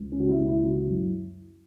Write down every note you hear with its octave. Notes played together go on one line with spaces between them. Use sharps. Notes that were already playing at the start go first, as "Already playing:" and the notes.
Already playing: C#2
C#4
C#3 F#4
E4
C#2
E4
C#3 F#4
F#2 E4